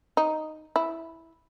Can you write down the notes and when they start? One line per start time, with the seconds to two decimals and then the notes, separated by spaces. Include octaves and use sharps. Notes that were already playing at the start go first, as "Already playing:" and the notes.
0.17 D#4
0.76 E4